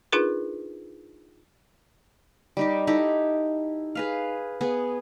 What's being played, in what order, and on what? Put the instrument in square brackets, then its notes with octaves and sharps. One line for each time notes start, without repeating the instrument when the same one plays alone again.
[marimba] D4 D#4 F4 G#4 A#4 B4
[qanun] G3 D#4 G4
D#4 E4 G4 A4
G#4 B4 F5
B3 G#4